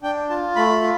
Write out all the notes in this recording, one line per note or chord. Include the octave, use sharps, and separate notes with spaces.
D4 G5
F4 A5
A3 B5
F4